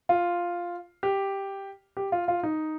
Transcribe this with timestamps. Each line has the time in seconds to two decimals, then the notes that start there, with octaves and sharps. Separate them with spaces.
0.09 F4
1.03 G4
1.97 G4
2.12 F4
2.28 F4
2.43 D#4